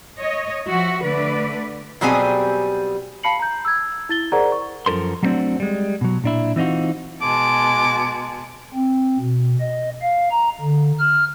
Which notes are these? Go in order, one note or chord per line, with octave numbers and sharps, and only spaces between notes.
C#5 D#5
F3 F#4 E5
D3 A3 B4 D5
B2 F#3 G3 C4 G#4 G#5
F5 A5 B5 C7 C#7 F#7
A#5 G6
E6 G#6
E4 A6 G7
G#4 A#4 C5 D5 F#5 A#5
C#6
F#2 F3 A4 A#4 C6
F#3 G3 A3 C4 D4 F#4
G3 G#3
B2 F#3
A#2 D4 E4
E3 C4 D#4 F4 F#4
B2 G#3 A5 D6
C4
B2
D#5
F5
A#5
D3
F6